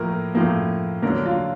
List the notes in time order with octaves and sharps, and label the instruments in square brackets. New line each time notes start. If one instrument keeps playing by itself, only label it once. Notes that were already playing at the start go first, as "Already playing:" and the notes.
Already playing: [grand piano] A2 F3 A#3 A#4
A2 F3 A#3
D3 F#3 A#3 A#4
F4